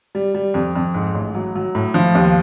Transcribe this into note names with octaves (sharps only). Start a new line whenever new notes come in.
G3
G3
F2
F2
G#2
A1
F#3
F#3
A2
F3
D#2